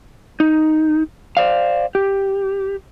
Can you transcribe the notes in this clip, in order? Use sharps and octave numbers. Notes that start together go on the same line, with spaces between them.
D#4
C5 D5 F5
G4